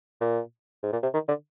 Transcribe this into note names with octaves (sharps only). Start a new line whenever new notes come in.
A#2
G#2
A#2
C3
D#3
D3